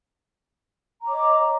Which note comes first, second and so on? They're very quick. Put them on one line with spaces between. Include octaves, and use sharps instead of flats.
A#5 D6 C#5 D#5